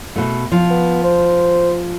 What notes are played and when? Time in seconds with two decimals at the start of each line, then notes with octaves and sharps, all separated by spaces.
0.16 B2 A3
0.52 F3
0.70 B3
1.04 C5